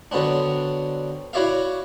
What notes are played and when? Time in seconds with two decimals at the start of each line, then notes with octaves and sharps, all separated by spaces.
0.11 D3 F#3 B3 C4 D4
1.33 E4 F#4 C#5 D5 E5 F5